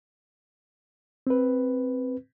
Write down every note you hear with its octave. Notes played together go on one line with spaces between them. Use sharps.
C4 B4